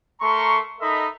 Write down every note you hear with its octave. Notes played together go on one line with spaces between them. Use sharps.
A3 A#4 A#5 C6 C#6
D#4 A4 A#4 D#5 E5 B5